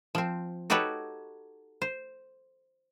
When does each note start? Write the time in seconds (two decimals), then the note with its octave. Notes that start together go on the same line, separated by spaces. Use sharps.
0.15 F3 C4
0.70 D#4 F#4 G4 A4 B4 C#5
1.82 C5